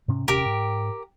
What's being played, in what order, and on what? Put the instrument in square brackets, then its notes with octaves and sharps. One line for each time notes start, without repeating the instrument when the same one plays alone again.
[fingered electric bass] G#2 C3 C#4
[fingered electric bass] D#1 C3 C#4 [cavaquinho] G4 A#4
[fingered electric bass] G#2